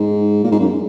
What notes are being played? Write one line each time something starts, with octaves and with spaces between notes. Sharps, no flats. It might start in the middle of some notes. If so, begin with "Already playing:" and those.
Already playing: G#2
A#2
G#2
F#2